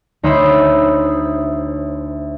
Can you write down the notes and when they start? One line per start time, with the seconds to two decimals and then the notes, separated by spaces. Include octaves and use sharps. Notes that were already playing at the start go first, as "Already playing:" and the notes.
0.23 D2 D#4 C5 C#5 E5 B5